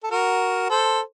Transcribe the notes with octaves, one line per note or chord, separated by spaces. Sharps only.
A4
F#4 A#4
A4 C5